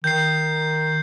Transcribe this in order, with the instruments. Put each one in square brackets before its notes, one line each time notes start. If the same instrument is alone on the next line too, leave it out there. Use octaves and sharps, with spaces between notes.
[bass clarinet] D#3 [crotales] G6 C7